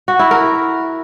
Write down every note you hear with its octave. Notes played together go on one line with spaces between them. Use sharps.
F#4
E4
A#4